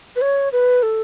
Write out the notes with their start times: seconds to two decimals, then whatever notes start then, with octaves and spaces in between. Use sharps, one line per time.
0.16 B4
0.22 C#5
0.52 B4
0.83 A4